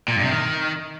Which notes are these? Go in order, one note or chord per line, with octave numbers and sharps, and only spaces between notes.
A#2
G2
C3
D#3